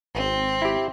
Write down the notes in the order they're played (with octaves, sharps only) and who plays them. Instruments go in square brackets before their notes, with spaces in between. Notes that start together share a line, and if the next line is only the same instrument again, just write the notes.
[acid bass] G#1 [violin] C4
[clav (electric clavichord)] E4 G4